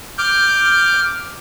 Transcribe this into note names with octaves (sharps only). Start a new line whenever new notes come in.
D6 F6 G6